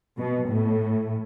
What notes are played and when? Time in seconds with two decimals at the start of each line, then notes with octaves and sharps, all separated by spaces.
0.18 B2
0.49 A2